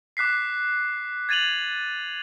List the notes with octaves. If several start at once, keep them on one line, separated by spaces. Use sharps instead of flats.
D6 F#6 B6 C7
G#6 A6 D#7 F7 F#7